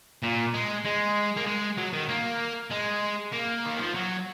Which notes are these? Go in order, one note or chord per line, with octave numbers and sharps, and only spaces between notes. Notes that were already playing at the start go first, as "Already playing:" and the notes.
A#2
G#3
G#3
A#3
G#3
F#3
D#3
A#3
G#3
A#3
D#3
F3
F#3